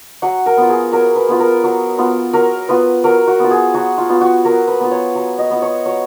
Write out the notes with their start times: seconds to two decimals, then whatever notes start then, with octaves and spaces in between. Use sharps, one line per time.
0.22 F#3 F#5
0.46 A#4
0.57 B3 F4
0.69 G#4
0.92 F#3 A#4
1.16 B4
1.28 B3 F4
1.40 A#4
1.64 F#3
1.98 B3 F4
2.33 F#3 A#4
2.69 B3 F4 B4
3.04 F#3 A#4
3.27 F#4
3.39 B3 F4
3.51 G#4
3.74 F#3 F#4
3.98 F4
4.09 B3 F4
4.21 F#4
4.45 F#3 A#4
4.68 B4
4.80 B3 F4
4.91 C#5
5.15 F#3
5.39 D#5
5.50 B3 F4
5.62 C#5
5.85 F#3 C#5